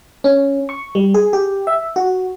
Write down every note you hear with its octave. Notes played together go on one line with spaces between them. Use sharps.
C#4
C#6
G3
G#4
G4
E5
F#4